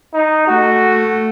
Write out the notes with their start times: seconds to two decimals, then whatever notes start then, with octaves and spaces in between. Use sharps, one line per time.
0.14 D#4
0.48 A3 F#4